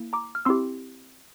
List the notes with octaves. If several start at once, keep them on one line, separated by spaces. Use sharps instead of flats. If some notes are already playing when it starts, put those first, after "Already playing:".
Already playing: A#3 E4
A#5 D6
F6
C4 E4 G4 C6 E6